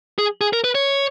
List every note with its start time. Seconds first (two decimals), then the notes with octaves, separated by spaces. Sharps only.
0.18 G#4
0.41 G#4
0.53 A#4
0.64 B4
0.75 C#5